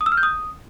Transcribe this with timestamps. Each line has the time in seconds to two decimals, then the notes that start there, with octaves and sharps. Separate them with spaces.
0.01 D#6
0.06 E6
0.12 F6
0.17 G6
0.23 D#6